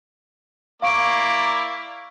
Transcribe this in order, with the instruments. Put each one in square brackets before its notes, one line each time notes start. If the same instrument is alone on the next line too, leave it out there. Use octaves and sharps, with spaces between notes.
[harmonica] A#3 E4 D5 [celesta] F5 C#6 D7